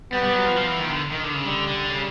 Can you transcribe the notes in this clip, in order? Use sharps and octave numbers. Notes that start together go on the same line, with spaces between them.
G3 B3
G3
F#3
F3
F3
E3
D#3
D3
D#3
D3
C#3
D3 G3
D3
C#3